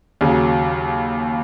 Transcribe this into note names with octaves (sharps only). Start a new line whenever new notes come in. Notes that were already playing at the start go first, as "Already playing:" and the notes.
D#2 C#3 F#3